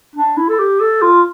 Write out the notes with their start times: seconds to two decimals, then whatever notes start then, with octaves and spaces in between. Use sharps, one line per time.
0.16 D4
0.37 E4
0.49 A4
0.59 G4
0.81 A4
1.02 F4